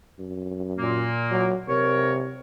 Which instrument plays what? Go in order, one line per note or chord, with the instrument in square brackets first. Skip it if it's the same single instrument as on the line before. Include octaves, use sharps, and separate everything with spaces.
[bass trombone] F#2
[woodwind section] A#2 A#3
[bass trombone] F#3
[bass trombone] C3 [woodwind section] A#4 C#5